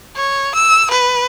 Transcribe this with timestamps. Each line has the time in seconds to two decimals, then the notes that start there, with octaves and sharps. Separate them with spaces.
0.16 C#5
0.55 E6
0.91 B4